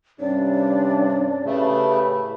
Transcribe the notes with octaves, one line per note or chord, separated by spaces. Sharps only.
G2 C3 C#4 D4 D5
A2 C#3 A3 G4 B4